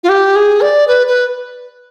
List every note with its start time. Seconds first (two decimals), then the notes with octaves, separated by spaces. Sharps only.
0.04 F4
0.09 G4
0.36 G#4
0.61 D5
0.88 B4
1.07 B4